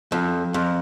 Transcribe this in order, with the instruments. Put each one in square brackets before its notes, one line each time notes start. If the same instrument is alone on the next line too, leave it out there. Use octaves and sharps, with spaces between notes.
[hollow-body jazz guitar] F2 [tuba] F3
[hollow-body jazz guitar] F2